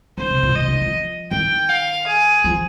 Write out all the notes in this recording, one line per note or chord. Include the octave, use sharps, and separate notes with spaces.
D3 C5
C3
A#2
C3 D#5
D3
F3
D#3 G5
F5
G#4
F3